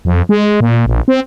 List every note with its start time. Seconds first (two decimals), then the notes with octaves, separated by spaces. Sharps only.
0.05 F2
0.29 G#3
0.60 A#2
0.86 A#1
1.08 C4